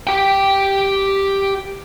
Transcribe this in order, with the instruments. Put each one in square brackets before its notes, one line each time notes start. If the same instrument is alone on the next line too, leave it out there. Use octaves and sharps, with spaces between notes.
[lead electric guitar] G4 G5